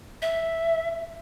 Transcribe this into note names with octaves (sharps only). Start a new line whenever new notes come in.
E5